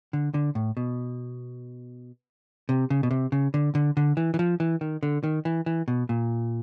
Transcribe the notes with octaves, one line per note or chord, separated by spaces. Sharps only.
D3
D3
A2
B2
C3
C#3
B2
C3
C#3
D3
D3
D3
E3
E3
F3
E3
D#3
D3
D#3
E3
E3
B2
A#2